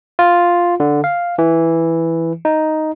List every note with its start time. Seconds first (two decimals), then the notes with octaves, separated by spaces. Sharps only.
0.19 F4
0.80 D3
1.04 F5
1.38 E3
2.45 D#4